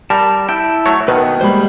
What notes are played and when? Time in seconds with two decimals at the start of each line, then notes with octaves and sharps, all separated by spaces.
0.10 G3 A#4 A5
0.49 E4 G5 A5 E6
0.86 F#3 A3 C#5
1.08 B2 D#3 B3 B4
1.41 G3 G#3 A#3 C5 B5